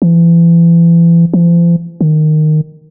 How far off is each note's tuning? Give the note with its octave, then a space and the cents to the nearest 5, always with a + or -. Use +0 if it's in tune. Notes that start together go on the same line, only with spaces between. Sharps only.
E3 +35
F3 -40
D#3 -15